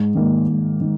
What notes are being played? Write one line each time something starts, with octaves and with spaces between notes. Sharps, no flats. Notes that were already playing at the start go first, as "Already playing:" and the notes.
Already playing: G#2
D#3 A#3
G#2
D#3